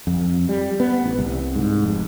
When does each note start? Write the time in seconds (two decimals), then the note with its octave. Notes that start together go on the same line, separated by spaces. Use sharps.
0.07 F2
0.49 G3
0.80 B3
1.04 A1
1.19 C2
1.55 G#2
1.84 F1